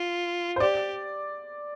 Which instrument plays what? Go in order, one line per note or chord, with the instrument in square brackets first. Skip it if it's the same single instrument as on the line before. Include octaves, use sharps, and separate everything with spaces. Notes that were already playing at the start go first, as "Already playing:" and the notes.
Already playing: [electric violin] F4
[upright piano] C5
[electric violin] G4 [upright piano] D5